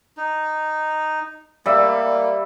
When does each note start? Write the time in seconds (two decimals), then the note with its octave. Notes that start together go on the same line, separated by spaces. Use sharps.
0.17 D#4
1.66 G3 A#3 E5